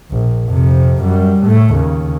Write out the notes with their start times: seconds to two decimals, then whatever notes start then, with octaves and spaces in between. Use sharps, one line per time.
0.11 A#1
0.48 F2 C3
1.02 F#2 G3
1.42 A2 A3
1.74 D#2 C#3